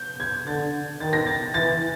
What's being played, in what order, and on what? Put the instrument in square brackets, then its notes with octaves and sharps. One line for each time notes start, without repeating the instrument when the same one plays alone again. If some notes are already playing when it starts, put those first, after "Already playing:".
Already playing: [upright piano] G6
G#6
[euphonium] D3 [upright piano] A6
[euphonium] D#3 [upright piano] A6
[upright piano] A#6
A6
[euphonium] E3 [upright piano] A6